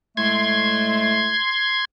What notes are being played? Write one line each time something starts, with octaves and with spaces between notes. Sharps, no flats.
A2 G#3 A3 C6 G#6